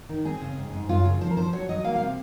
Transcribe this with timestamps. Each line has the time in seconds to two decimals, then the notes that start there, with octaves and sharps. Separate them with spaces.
0.09 D#3
0.25 C4 G#4
0.42 C#3
0.57 G#2
0.73 G#2
0.89 F#2 F4
1.05 C#3
1.21 F3 C5
1.31 A#4
1.37 F3 C5
1.53 F#3 C#5
1.69 F#3 D#5
1.85 A#3 F5
1.96 C3 F5